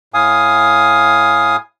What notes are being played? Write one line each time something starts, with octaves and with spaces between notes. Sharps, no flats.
A2 F5 G#5 D#6